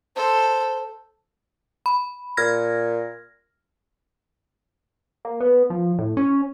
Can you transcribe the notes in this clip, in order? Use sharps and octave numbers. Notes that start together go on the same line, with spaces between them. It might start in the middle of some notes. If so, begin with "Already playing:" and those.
A4 C5
B5
A#2 F6 G#6 A#6
A#3
B3
F3
A2
C#4